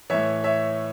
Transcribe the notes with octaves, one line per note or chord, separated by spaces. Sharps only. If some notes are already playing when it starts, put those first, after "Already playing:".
A2 E3 C#5 E5
C#5 E5